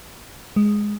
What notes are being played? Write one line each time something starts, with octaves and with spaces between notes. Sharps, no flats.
G#3